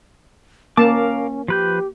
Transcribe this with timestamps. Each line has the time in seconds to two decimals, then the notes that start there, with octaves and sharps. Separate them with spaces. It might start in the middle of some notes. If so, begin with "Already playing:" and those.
0.77 A#3 C#4 A#4 F5 A5 D6
1.48 F3 G4 B4 G6